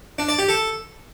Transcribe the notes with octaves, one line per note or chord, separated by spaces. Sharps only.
D4
D5
G4
A4